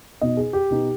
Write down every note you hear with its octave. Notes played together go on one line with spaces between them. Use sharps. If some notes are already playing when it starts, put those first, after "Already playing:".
B2 B3 D#4 D#5
G#4
G4
B2 B3 D#4